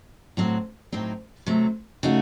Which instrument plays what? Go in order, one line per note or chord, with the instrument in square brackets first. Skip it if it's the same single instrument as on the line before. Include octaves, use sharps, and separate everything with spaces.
[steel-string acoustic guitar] A2 F#3 C4 F#4
A2 F#3 C4 D#4
C3 F#3 A3
C#3 A3 D#4 F#4